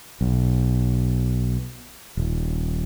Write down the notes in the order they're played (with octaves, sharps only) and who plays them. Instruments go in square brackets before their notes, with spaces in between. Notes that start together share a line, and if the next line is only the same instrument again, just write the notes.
[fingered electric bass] B1
D#1